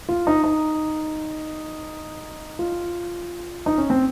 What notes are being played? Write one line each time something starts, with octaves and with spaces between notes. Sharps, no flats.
F4
D#4
D#4
F4
D#4
C#4
C4